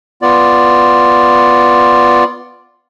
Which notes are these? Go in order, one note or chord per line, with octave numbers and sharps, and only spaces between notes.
B3 F4 D5